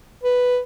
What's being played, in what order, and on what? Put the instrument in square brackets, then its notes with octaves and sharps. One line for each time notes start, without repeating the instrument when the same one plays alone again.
[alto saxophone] B4